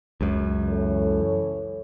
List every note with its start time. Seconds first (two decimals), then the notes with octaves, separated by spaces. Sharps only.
0.21 C#2 F#2
0.69 E3 A4 C#5